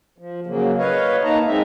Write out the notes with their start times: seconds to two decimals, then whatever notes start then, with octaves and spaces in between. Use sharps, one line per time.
0.18 F3
0.47 C#3 F#3 A#3
0.78 B4 C#5 D#5 F5
1.23 A#3 D#4 A5 A#5
1.47 G#3 C4 D#4 E5